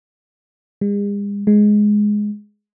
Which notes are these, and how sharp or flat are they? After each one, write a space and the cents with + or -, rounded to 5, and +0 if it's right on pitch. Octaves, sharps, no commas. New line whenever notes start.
G#3 -45
G#3 +5